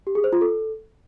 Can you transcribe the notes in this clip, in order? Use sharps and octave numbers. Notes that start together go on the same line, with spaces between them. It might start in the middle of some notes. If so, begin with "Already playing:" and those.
G4
G#4
C5
F4
A4